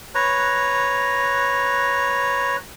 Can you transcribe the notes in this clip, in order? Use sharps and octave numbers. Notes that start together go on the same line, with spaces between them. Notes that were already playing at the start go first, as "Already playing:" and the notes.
B4 C#5 A#5